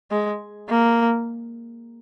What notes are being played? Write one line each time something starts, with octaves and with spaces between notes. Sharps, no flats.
G#3
A#3